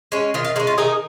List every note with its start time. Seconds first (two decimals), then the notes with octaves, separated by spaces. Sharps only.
0.12 G#3 C#4
0.34 D#3 F4
0.45 F4
0.56 G#3 D#4
0.60 C#4
0.67 F4
0.78 D#3 D#4 G#4